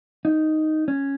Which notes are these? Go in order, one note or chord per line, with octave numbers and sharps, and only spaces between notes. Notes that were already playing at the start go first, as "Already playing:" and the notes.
D#4
C#4